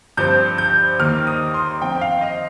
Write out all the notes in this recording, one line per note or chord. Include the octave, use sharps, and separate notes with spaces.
G2 F3 C4 G6
G6
D#2 D#3 A#3 F6
D#6
C6
F2 F3 C4 G5
G5
F5
D#5